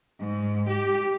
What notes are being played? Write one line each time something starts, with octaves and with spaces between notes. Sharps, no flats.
G#2
G4